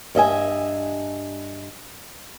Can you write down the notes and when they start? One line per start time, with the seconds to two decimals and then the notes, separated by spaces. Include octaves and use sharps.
0.15 G2 D#5 E5 G#5